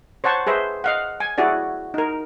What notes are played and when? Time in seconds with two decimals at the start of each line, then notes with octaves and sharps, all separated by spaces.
0.24 C5 C#5 F#5 A5 C#6
0.47 G#4 B4 C5 E5
0.84 D#5 F5 F#5
1.20 G#5
1.38 E4 F#4 G#4 D5
1.94 D#4 A#4